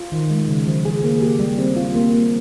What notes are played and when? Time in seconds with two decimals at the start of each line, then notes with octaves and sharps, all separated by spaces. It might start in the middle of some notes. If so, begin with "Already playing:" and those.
Already playing: F4
0.12 D#3
0.30 G#3
0.48 C#3
0.67 F3
0.85 G#4
1.04 A#3
1.22 G4
1.39 G3
1.58 C4
1.76 F4
1.95 A#3
2.13 G3